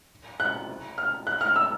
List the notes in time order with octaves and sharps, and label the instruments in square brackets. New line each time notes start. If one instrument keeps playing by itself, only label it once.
[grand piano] F#6
F6
F#6
F6
E6